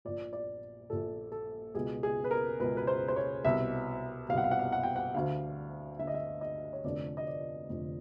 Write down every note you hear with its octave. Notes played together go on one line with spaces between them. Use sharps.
A#1 A#2 D5
D5
A#1 A#2 A4
A4
C#2 B2 G#4
G#4
B4
A#4
C#2 B2 B4
B4
C5
C5
C#5
C2 B2 E5
C2 B2 F5 F#5
F5
F#5
F5
F#5
G5
F#5
D2 D3 F5
D2 D3 E5
D#5
E5
D#5
C#5
F1 F2 D3 D5
D#5
D5
F1 F2 D3